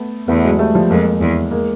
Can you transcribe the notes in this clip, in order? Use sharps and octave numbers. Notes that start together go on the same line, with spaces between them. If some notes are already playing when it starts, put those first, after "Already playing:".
Already playing: A3 B3
E2 A3 B3
F#3 G#3
G3 A3
F3 G3
F2 G#3 A#3
E2
G#3 A#3